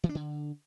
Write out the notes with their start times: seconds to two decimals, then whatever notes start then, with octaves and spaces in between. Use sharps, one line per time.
0.04 E3
0.09 D4
0.15 D3